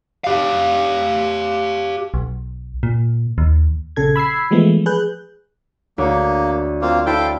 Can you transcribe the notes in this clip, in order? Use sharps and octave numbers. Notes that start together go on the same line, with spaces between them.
G4 F5
B1
A#2
D#2
A#1 C#3 A4 G#6
B5 E6 G#6 C7
E3 F3 G#3 A3 B3
G#4 B4 F#6 G6
D2 A#3 C#5
A#3 C4 F4
E4 A4 C5 F5 G5